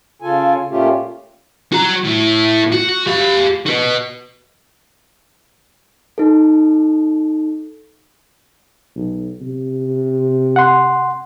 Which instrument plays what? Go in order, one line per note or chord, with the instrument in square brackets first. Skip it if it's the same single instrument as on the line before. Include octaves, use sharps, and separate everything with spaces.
[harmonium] C#3 F4 A4 G#5
A#2 A3 C#4 F4 G4
[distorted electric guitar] F#4 A#5
A2
F#4
G4 F5
F#4 B4
[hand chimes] D#4 A4
[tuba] B1
C3
[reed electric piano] F#5 C6